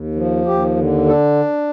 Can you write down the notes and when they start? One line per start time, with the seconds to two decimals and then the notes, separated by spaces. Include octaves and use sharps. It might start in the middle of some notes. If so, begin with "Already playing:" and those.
Already playing: D#2
0.15 F3
0.46 D#2 G4
0.76 D3
1.06 D4 A4